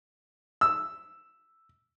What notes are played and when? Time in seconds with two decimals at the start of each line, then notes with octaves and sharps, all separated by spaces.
0.61 E6